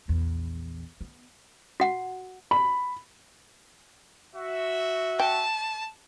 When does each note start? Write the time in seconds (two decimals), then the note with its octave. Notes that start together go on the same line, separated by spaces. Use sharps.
0.08 A#1 E2
1.01 B3
1.80 F#4 F#5
2.51 B5
4.36 F#4 E5
5.20 G5 A5